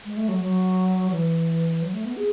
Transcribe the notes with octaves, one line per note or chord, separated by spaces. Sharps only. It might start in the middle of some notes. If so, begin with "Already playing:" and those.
G#3
A3
F#3
F#3
E3
F#3
A3
B3
G#4